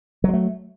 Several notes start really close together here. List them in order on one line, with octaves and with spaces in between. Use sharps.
F#3 G#3 A3